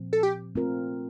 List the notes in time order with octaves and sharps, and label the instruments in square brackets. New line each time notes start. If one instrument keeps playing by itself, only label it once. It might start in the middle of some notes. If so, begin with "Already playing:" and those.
Already playing: [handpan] A#2 F3 C4
[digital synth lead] A4
G4
[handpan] A3 C4 F4 A#4